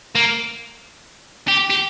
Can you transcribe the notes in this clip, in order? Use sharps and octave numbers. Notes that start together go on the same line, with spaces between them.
A#3
G4
G4